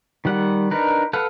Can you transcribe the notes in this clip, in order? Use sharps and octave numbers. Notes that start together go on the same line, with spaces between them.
D#3 G3 F#5
D4 D#4 A#4 B4
A4 B4 F5 F#5